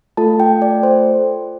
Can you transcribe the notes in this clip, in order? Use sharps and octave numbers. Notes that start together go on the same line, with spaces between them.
A3 F4 A4 A5
G5
D5
C5